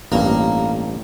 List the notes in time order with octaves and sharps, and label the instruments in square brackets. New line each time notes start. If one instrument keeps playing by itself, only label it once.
[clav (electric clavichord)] A1 G2 [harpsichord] A#3